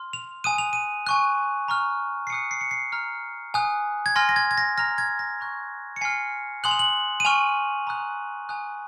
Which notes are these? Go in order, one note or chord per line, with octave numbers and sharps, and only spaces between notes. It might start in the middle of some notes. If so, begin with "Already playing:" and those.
Already playing: C6 F6
F7
G#5 D#6 F#6 D#7
F7
D#7
G#5 C#6 F#6
A#5 C#6 F6
C7
G#5 D#6 F#6 C#7
C7
C#7
C7
A#5 F6
G#5 D#6 F#6
G#6
G#5 C6 F6 A#6
A#6
G#6
G#6
A#6
A#5 F6 A#6
G#6
A#6
A#5 C#6 F#6
C#7
G#5 C6 F6 C7
G#5 C6 D#6 F#6 F#7
F7
F#7
D#7
G#5 C#6 F6 F7
A#5 D#6 F#6
G#5 D#6 F#6